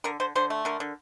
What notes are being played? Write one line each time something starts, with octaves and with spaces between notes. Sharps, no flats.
D3 A#4
D3 C5
D3 C5
A3
D3 A#4
D3